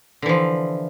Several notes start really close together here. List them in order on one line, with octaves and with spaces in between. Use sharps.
D3 E3 F3